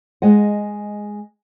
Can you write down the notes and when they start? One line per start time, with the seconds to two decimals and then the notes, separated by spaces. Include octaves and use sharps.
0.22 G#3 D#5 F#5